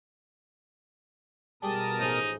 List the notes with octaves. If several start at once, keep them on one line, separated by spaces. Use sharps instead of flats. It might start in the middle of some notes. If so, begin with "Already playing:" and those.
B2 G3 G4 G#4 A#4 A5 D#6
A1 F3 D#4 G#4